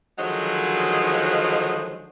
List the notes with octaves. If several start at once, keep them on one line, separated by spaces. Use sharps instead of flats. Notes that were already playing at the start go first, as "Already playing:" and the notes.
D3 D#3 F3 F#3 G#3